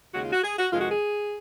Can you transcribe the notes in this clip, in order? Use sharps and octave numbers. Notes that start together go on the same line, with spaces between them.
D#2 C#3 G#3 F#4
F4
F#4
G#4
F#4
F2 C3 D#3 G#3 F4
F#4
G#4